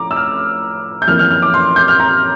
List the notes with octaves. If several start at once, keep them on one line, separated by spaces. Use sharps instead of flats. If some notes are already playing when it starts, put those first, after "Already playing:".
Already playing: A2 F3 A#5 D6
E6
F6
G6
F2 E3 A#3 F6
F6
F6
D6
C6
G6
F6
A#5